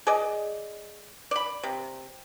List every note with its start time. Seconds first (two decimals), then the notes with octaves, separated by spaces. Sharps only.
0.07 G#4 D5 D#5
1.31 D5 B5
1.63 C3